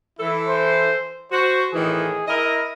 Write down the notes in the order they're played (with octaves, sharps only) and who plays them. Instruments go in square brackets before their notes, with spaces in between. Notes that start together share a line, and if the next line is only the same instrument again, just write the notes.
[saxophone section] E3 A4 [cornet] E4
[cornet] C5
[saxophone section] F#4 [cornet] C5
[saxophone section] A2 D#3 E3 [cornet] G#4
[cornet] E4 [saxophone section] A#4 D#5